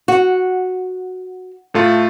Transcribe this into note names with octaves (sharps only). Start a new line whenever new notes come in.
F#4
A2 A3 F4